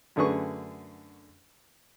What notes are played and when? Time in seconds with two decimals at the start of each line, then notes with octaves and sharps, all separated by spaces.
0.16 F#2 D3 A3 G#4 B4 C#6